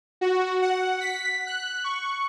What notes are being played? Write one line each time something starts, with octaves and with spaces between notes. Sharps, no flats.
F#4
F#5
B6
F#6
C#6